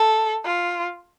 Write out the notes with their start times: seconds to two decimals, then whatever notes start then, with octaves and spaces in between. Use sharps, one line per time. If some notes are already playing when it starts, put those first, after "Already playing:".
Already playing: A4
0.45 F4